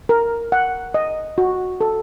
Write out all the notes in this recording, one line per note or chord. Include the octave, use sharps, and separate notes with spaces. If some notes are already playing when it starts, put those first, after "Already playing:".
A#4
F#5
D#5
F#4
A4